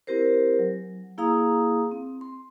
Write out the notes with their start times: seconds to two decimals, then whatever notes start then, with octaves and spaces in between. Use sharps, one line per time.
0.07 C4 E4 G4 A#4 C5
0.59 F#3
1.18 A#3 E4 G#4 F5 A#5 D#6
1.92 C4
2.21 C6